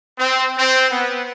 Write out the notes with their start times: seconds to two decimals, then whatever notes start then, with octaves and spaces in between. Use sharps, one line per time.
0.19 C4
0.58 C4
0.90 B3